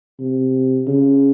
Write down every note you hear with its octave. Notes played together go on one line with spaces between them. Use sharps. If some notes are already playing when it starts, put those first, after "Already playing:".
C3
C#3